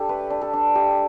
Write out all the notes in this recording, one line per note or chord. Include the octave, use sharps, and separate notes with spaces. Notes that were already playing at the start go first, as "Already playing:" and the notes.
Already playing: D4 G4 A4
A3 B4
D4
A4
D4
A3 G4